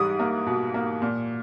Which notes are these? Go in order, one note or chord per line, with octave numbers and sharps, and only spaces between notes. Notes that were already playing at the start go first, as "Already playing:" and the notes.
Already playing: G#2 E3 G3 D#6
A#3
B2
A#3
A#2